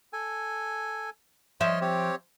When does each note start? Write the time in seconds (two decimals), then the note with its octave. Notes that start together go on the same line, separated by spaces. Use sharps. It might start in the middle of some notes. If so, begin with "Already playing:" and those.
0.13 A4 G#5
1.61 F3 C#5 D#5 E5 C6
1.81 C4 G4 C#5